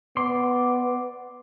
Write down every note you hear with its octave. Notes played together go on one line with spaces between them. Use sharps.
B3 D5 C6